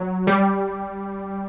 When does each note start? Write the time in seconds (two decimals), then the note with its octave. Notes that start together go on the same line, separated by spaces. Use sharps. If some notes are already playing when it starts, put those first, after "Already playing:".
Already playing: F#3
0.27 G3